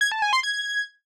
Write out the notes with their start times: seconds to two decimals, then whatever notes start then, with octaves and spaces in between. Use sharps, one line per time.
0.01 G#6
0.12 A5
0.22 G#5
0.33 C6
0.43 G#6